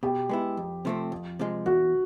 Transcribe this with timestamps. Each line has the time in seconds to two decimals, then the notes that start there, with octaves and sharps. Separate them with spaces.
0.03 B2 G4
0.29 G#3 B3 E4
0.57 F2
0.85 C3 F3 A3 C4
1.12 F2
1.39 C3 F3 G#3
1.66 E2 F#4